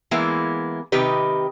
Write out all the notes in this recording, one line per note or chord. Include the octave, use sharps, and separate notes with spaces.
E3 G#3 A#3 B3 E4
C3 D#3 D#4 G4 B4